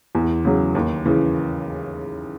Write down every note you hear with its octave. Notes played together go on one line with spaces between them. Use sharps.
E2
C#3 F#3
D#2
C#3 E3